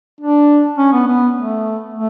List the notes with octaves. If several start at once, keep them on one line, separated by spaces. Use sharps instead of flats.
D4
C#4
B3
B3
A3
A3